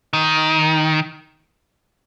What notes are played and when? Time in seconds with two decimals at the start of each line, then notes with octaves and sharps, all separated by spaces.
0.13 D#3